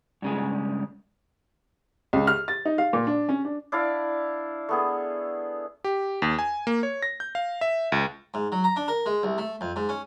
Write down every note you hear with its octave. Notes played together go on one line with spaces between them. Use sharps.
G2 C#3 G#3
C#2
F6
A6
D#4
F5
A#2
D4
C#4
D4
D4 E4 D5 F5
A3 B3 G#4
G4
D#2
G#5
A#3
C#5
A#6
G6
F5
E5
C#2
G#2
F#3
A#5
D4
A#4
G#3
C2
A3
F2
G#2
C#4